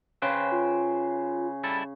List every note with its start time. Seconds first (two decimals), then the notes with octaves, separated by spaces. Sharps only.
0.22 C#3 B4 C5 G5
0.51 F4
1.64 G3 E4 A4